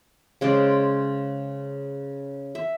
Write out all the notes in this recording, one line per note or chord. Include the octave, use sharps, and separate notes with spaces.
C#3 G#3 C5 D5
E5